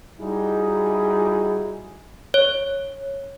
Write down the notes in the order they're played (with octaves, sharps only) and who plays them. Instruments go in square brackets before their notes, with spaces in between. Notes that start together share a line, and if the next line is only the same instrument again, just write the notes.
[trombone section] G3 D#4 E4 F#4 G#4
[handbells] C#5